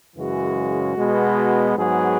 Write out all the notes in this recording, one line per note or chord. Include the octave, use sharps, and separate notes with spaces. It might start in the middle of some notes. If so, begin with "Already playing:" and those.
F#2 C#3 E3 G#3 F#4
B2 G#3 B3
G#2 F#3 B3 G#4